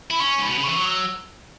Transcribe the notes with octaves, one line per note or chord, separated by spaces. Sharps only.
E4 B5
C#4 C#6
G#2 B5
B2
C#3
E3 C#6
F#3
E6